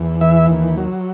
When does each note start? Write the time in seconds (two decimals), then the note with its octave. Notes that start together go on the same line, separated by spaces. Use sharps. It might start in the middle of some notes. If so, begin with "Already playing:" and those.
Already playing: E2
0.21 E3 E5
0.49 D#2
0.77 F#3